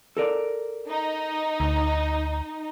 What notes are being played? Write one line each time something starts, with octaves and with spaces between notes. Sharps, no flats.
A4 A#4 D5
D#4
D2